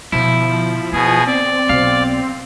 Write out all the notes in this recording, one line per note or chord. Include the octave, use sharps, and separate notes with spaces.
B2 D3 F3 E4
B2 B3 G#4
C4 D5
B1 F5